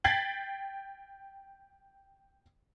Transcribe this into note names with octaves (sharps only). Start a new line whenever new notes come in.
G5 G#6 A6 B6 C7 F#7